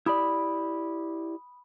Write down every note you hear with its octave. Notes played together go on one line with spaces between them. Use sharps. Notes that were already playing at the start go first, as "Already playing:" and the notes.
E4 G4 D5 B5 D#6